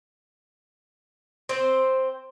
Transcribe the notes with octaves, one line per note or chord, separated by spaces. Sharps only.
C4 C5